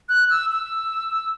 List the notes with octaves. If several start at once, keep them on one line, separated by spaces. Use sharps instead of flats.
F#6
E6
E6